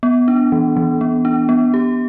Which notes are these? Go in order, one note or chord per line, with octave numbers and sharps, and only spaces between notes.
B3
D4
E3
E3
B3
D4
B3
G4